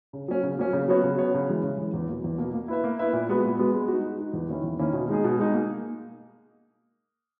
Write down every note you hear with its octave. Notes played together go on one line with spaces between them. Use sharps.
C#3
F#3 A#3 C#4
C#3
F#3 A#3 C#4
C#3
F#3 B3 F#4 C#5
C#3
F#3 B3 F#4 C#5
C#3
E3 G#3
C#3
E3 G#3
E2
B2 A#3
E2
B2 A#3
A#3
E4 B4 E5
A#3
E4 B4 E5
A#2
G#3 B3 F#4 B4
A#2
G#3 B3 F#4 B4
G#3
D#4 F#4
G#3
D#4 F#4
E2
D#3 A#3 C#4 E4
E2
D#3 A#3 C#4 E4
B2
G#3 D#4 G#4
B2
G#3 D#4 G#4
A#3